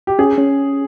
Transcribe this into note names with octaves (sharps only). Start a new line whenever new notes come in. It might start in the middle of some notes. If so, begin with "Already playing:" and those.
G4
C#4 G#4
C#4